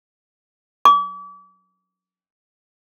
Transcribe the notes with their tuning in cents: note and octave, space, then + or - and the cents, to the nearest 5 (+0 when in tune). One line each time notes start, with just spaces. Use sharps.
D6 -40